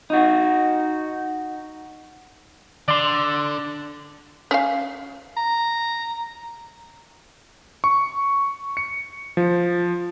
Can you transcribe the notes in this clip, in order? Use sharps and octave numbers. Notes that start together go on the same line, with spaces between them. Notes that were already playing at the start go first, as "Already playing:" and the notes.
D#4 F#4
D3 D5 C6
C#4 F5
A#5
C#6
C#7
F3